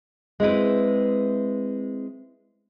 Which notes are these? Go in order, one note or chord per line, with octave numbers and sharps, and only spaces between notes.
G#3 C4 E4 B4